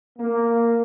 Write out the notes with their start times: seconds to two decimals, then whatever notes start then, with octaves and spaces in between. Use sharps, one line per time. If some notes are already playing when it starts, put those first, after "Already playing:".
0.18 A#3